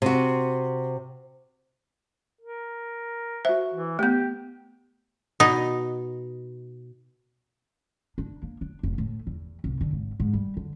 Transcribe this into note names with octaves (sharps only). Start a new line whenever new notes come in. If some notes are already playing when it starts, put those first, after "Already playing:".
C3 F#4
A#4
F#4 C5 E5
E3
A3 B3 G4 G5
B2 D#4
D4
A#3
D4
F1
A2
E2
C2
D3
G#1
G#2
G3
D3